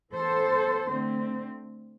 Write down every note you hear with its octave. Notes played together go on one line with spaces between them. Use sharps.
E3 B3 A4 C5
D3 A3 C4